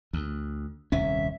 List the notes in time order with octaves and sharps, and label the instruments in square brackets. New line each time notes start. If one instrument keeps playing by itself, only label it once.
[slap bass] D2
[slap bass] D#1 C2 C#4 [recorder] E5